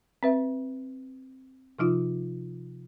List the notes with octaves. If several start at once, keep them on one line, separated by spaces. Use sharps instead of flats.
C4 B4 E5
C3 F3 D#4 F4